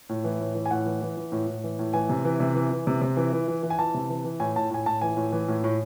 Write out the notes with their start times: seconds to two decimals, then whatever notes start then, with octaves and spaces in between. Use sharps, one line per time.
0.09 A2
0.24 E3
0.40 A2
0.55 E3
0.66 G#5
0.71 A2 F#5
0.86 E3
1.02 E3
1.17 E3
1.32 A2
1.47 A2
1.64 E3
1.79 A2
1.93 E3 G#5
2.09 C3
2.25 E3
2.40 C3
2.55 E3
2.71 E3
2.87 C3
3.01 C3
3.17 E3
3.33 E3
3.48 E3
3.63 E3
3.70 G#5
3.79 E3 A5
3.94 C3
4.10 E3
4.24 E3
4.40 A2 G#5
4.56 A2 A5
4.70 A2 G#5
4.86 A2 A5
5.01 E3 G#5
5.17 A2
5.32 E3
5.48 A2
5.64 A2